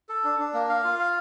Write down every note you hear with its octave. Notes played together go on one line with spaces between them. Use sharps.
A4
D4
D4
A#3
F5
F4
F5